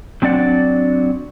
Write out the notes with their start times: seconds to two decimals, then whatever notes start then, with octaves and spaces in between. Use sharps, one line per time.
0.22 F#3 C4 D4 D5 F#5